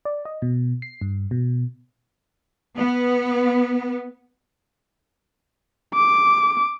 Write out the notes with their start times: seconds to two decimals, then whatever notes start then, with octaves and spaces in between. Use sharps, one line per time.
0.05 D5
0.25 D#5
0.42 B2
0.82 C7
1.01 G2
1.31 B2
2.77 B3
5.94 D6